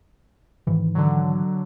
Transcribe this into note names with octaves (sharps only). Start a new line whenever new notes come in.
G#2 D#3 E3
D3 F#3